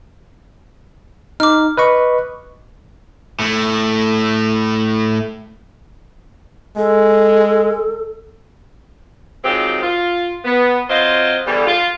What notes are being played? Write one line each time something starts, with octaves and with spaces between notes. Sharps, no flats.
D#4 D6 F6
B4 D#5 C#6
A2 A3
G#3 A4
D#3 F#3 G#3 C4 F4 G4
F4
B3
F#3 C4 F4 C5 D#5
E2 D3 G3
F4